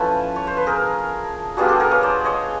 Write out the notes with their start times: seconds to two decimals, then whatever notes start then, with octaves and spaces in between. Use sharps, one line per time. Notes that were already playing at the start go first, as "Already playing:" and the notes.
Already playing: F3 A3 C#4 E4 A4 B4
0.36 C#5
0.47 C5
0.57 B4
0.67 G#4 A#4
1.57 G3 B3 D4 F4 F#4 G#4
1.68 G4 A4
1.80 G#4 A#4
1.91 B4 C#5
2.03 C5 D5
2.24 C#5 D#5